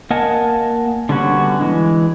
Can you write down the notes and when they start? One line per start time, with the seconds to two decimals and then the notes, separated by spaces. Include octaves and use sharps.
0.10 A#3 A#4 D#5 F#5 G#5 A5
1.09 D3 G3 B3 C#4 F#4
1.60 E3 G#3